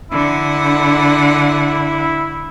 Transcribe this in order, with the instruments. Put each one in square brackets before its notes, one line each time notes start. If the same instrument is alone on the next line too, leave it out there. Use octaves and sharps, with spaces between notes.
[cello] D3 F#5 [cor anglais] E4